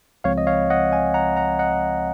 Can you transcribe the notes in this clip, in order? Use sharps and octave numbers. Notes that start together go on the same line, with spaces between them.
C#2 C#3 F3 G#3 C4 C#5 F5
D#5
C#5 F5
D#5 F#5
F5 G#5
F#5 A#5
F#5 A#5
D#5 F#5